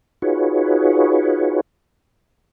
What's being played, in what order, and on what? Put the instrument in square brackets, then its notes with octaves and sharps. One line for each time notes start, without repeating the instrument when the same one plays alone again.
[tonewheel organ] D#4 F4 F#4 G#4 B4 C#5